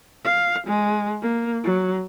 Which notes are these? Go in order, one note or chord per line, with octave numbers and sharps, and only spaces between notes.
F5
G#3
A#3
F#3